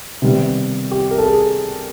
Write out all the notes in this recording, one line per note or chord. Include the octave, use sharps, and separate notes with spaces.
C3 D#3 G3 B3
G4
A#4
A4
G#4